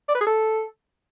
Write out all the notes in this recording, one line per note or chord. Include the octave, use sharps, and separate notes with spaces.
D5
B4
G#4
A4